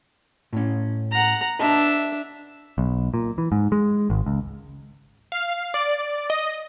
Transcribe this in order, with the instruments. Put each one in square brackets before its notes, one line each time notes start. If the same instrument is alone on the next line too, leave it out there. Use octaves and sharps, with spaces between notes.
[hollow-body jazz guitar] A2 C#4
[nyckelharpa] F#5 A#5
[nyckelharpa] D4 E5 [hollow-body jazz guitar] B4 D#5 A5
[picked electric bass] B1
A#2
E3
G#2
G#3
G#1
C#2
[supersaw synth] F5
D5
D#5